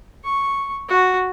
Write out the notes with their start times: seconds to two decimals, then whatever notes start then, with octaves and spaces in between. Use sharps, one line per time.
0.24 C#6
0.88 F#4